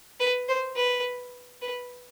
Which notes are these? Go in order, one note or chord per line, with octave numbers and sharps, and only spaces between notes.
B4
C5
B4
B4